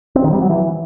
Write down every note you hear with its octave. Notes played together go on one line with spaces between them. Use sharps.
C4
D#3
G3
F#3
E3